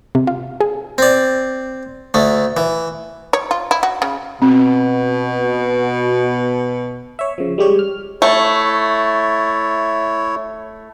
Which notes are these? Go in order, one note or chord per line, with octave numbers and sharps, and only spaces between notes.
C3
F4
G#4
C4 D5
D2 A3
E3
C#5
F4
E4
F#4
C#3
B2 C4
C#5 E5
C#3 F3
G3 G#3 G4 C#5
F6
A3 E4 C#5